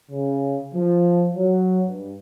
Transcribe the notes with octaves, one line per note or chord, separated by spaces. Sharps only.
C#3
F3
F#3
G2